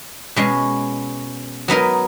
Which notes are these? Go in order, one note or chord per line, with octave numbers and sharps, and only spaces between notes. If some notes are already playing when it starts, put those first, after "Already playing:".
B2 G#3 C#4
F#3 B3 D#4 A#4